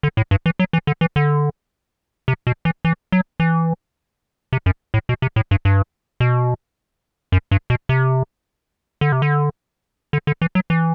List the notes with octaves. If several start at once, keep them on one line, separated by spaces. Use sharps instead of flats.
D3
A2
G2
E3
F#3
E3
D3
E3
D3
C3
B2
E3
E3
F#3
E3
C3
F#2
A2
B2
C3
A2
G2
G2
B2
F#2
G2
B2
C3
D3
C3
D3
D3
D3
E3
F#3
E3